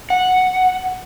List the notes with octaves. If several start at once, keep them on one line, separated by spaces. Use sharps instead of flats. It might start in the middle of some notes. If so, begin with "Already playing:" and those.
F#5